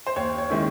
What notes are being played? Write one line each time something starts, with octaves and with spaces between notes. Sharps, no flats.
C5
D#2 C#5
C#5
D#3 G#3 C#4 E4